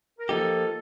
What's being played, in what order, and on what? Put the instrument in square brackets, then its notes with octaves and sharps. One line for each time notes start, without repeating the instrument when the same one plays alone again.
[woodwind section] A#4
[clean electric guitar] F3 A#3 D#4 G4 [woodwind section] A4